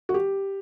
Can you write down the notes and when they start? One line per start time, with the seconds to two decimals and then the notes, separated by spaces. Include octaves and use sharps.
0.09 F#4
0.14 G4